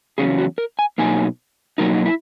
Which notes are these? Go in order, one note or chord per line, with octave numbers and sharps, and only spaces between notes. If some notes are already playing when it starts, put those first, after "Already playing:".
E2 C#3 F#3 C#4 G#4
F#4
A#4
G#5
B2 F#3 A#3 D#4 G#5
B2 F#3 A#3 D#4 A#4
E4